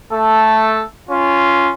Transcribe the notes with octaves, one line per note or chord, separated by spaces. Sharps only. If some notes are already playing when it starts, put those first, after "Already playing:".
A3 A4
C#4 F4